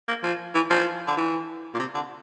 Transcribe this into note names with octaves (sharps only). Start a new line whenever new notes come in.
A#3
F3
E3
F3
D3
E3
A#2
C3
D3